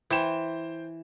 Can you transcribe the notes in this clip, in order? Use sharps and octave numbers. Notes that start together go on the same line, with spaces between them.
E3 C5 G5 E7